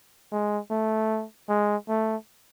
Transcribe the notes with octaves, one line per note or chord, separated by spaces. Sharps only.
G#3
A3
G#3
A3